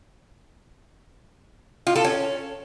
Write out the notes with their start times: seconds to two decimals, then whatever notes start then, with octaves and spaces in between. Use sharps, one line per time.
1.87 F4
1.96 A4
2.05 C#4